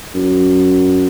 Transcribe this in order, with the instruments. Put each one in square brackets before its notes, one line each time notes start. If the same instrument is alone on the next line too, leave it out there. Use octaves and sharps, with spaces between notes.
[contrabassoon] F#2